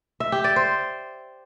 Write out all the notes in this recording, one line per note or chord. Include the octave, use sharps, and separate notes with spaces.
E5
G4
D5
C5